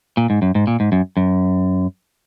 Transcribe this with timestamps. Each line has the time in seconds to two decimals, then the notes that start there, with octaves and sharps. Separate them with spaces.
0.17 A#2
0.30 G#2
0.42 F#2
0.55 G#2
0.67 A#2
0.80 G#2
0.92 F#2
1.17 F#2